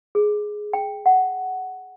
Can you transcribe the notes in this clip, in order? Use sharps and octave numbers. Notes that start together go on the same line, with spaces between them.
G#4
G5
F#5